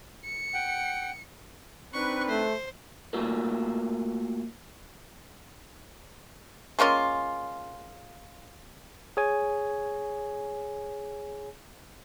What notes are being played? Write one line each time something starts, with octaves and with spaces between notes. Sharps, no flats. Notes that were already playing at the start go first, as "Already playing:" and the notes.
C#7
F#5 G5
C4 D4 D#4 B4 C#6
A3 C5
A3 A#3 F4 F#4 A4 A#4
G#3 A#3 C#4 F4
G#4 C#5 G#5